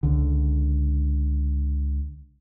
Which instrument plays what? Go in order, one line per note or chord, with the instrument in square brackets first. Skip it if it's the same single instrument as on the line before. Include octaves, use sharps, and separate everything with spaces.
[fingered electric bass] C#2 D3